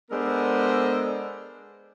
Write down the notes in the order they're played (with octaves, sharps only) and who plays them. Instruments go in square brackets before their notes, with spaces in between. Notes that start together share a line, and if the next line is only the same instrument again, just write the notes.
[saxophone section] G#3 B3 D4 A4 A#4 C5